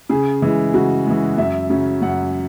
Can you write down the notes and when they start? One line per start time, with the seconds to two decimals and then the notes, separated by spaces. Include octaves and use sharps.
0.10 C#3 G#4
0.42 E3 G#3
0.74 C#3 F#4
1.06 E3 G#3
1.38 F#2 E5
1.70 C#3 F#3 C#4
2.02 F#2 F#5